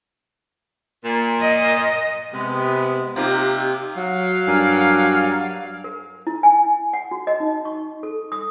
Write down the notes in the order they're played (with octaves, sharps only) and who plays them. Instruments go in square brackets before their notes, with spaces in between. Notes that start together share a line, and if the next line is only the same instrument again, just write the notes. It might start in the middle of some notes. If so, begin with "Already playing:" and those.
[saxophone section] A#2
[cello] D#5
[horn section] C3 G#3 B3
[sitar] C3 A#3 [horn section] D#4 F4 G4
[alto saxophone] F#3 [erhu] F5
[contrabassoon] G2 [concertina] A#4 D5 G#5
[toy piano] A#4
E4
G#5
F#5
F#4
D#5
D#4
C#6
A4
D#6